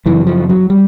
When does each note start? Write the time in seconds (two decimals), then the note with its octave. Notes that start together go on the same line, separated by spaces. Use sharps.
0.06 F#2 C#3 E3
0.27 F3
0.49 F#3
0.70 G3